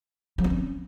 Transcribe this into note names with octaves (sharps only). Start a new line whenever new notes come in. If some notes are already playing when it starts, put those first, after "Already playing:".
F#3
B3
C#4